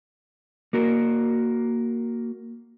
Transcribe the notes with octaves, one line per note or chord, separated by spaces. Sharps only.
A#3 F#4 A#4